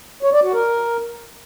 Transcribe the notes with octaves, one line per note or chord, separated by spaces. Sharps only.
C#5
D5
F#4
A#4